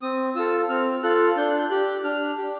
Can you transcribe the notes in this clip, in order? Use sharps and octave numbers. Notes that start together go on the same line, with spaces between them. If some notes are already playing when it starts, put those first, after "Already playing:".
C4 D#6
F4 A4 E6
C4 F6
F4 A4 F#6
D4 G6
F#6
G6
G4 F#6
D4 F6
G4